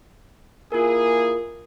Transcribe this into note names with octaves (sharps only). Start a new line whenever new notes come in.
A#3 E4 F4 G#4 A#4